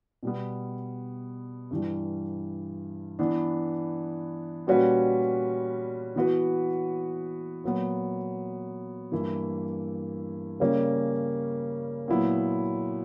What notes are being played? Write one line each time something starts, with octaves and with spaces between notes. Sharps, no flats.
B2 G3 B3
G2 E3 G3
E3 B3 D4
A#2 G3 C#4 F#4 B4
E3 B3 F#4 B4
A#2 F#3 B3
G2 E3 A#3 E4
C#3 G3 A#3 C#4
A#2 F#3 B3 E4